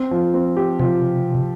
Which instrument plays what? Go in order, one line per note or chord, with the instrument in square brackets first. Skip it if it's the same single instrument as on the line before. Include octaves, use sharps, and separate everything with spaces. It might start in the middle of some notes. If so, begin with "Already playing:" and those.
Already playing: [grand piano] C4
F3
C4
G4
[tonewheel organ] C3 [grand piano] F3